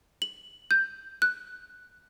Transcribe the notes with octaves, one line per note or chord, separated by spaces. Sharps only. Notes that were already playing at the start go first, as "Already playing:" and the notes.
F#7
G6
F#6